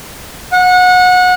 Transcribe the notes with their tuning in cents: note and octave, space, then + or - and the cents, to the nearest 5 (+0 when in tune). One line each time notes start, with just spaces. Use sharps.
F#5 -25